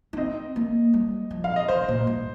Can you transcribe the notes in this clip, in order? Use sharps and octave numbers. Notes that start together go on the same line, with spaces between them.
D#4
C4 D#5
A#3
G3
F3
F5
D#5
D#3 C5
A#2
G2